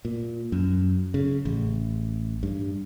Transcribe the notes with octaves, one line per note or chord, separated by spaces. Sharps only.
A#2
F#2
C#3
A1
G2